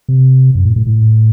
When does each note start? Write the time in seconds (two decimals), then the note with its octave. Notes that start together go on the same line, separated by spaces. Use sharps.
0.09 C3
0.55 F#2
0.65 A2
0.76 A2
0.86 A2